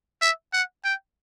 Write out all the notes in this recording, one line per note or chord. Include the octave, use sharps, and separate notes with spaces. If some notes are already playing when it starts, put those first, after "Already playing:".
E5
F#5
G5